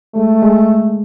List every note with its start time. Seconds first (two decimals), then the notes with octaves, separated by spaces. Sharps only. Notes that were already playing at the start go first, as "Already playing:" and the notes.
0.15 G#3 A3
0.43 G#3